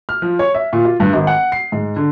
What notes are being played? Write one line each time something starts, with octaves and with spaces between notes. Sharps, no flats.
F6
F3
C#5
E5
A#2
F4
G2
G#1
F#5
C7
G#2
D3